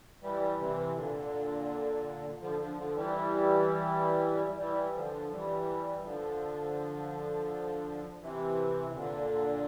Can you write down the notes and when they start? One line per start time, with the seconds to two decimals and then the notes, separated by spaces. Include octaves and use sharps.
0.23 E3 G3
0.59 C3 E3
0.95 A#2 D3
2.41 D3 F3
2.59 D3 F3
2.77 D3 F3
2.95 E3 G3
4.58 E3 G3
4.95 D3 F3
5.31 E3 G3
6.04 D3 F3
8.21 C3 E3
8.95 A#2 D3